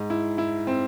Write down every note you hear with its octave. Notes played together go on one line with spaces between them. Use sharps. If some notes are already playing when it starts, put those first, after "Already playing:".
Already playing: G#2
E4
E4
C4